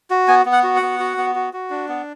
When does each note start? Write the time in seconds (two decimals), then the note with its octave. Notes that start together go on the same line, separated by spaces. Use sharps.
0.10 F#4
0.28 B3 G#5
0.45 B3
0.52 F#5
0.63 F#4
0.76 F#5
0.82 B3
1.00 F#4
1.17 B3
1.35 F#4
1.53 F#4
1.70 D4
1.89 B3